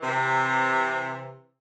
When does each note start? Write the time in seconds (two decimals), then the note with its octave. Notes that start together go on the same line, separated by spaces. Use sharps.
0.01 C3 E3